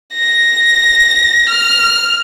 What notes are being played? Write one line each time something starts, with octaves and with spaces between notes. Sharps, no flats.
A#6
F6